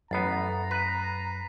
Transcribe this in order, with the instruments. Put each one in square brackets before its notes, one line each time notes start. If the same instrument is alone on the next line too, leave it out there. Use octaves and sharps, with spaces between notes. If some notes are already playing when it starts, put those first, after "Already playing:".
[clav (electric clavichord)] A1 B3 [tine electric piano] F#2 [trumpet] A#5 [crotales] A6 C7
[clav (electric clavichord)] B4 [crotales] B6 D#7